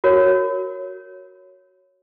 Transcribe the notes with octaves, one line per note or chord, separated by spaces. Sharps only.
F#4 A#4 C#5